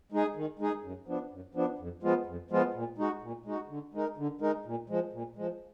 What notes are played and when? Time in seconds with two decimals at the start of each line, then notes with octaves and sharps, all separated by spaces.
0.12 G#3 D#4 G#4
0.36 D#3
0.59 G#3 D#4 G#4
0.83 F#2
1.07 F3 B3 D4
1.31 F#2
1.54 F3 B3 D4
1.79 F2
2.03 F3 G#3 B3 F4
2.26 F2
2.51 F3 G#3 B3 F4
2.74 A#2
2.98 G#3 D#4 F#4
3.22 A#2
3.46 G#3 D#4 F#4
3.69 D3
3.94 G#3 D#4 A#4
4.17 D3
4.41 G#3 D#4 A#4
4.66 A#2
4.89 F3 G#3
5.13 A#2
5.37 F3 G#3